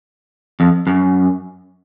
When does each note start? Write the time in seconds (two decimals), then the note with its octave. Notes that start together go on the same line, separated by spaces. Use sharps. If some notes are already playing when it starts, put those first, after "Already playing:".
0.60 F2
0.87 F#2